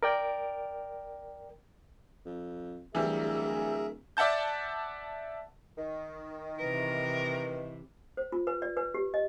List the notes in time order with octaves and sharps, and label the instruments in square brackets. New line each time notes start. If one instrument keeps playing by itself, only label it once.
[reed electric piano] A#4 D5 G5
[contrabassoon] F2
[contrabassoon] D1 [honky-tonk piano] E3 G3 [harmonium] G#4 A#4 E5
[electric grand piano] D5 E5 F#5 A5 G6
[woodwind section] D#3
[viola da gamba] C3 E3 [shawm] A#4 [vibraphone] B4
[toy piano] C5
F4
B4
D5
B4
G4
D#5